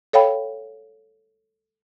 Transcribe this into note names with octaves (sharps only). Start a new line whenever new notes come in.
A4 C#5 F5 G5 B5